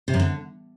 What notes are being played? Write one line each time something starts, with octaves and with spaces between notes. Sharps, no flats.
C3
F#2
D3